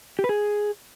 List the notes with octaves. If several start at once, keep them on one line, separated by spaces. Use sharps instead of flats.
G4
B4
G#4